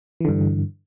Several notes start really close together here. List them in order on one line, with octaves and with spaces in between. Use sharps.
E3 D3 G2